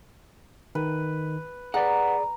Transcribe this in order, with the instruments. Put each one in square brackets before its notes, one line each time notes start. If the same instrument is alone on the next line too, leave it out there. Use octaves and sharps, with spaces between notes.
[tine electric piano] D#3 [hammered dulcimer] B4
[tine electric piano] G#4 D5 [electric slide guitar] B4 F#5 [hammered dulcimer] A#5